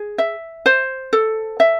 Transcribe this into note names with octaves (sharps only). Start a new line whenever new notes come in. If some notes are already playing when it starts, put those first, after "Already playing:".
Already playing: G#4
E5
C5
A4
E5